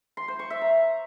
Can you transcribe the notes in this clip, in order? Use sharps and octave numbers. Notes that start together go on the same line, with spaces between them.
C6
C5
C#6
E5
A#5